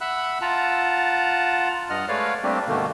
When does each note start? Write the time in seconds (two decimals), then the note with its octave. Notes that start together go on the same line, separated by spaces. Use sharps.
0.01 E5 F#5 B5 E6 F#6
0.41 F4 F#5 A5 A#5
1.90 G2 D#5 F#5 F6
2.08 G#3 A3 B4 C#5 D5 F5
2.43 G3 A3 A#3 C4 D4 G4
2.68 G2 B2 D3 D#3 A3 A#3